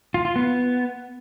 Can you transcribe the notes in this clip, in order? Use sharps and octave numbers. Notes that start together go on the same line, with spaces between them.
F4
F4
B3